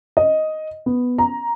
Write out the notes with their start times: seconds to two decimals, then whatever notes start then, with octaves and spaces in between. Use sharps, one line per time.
0.17 D#5
0.86 B3
1.19 A#5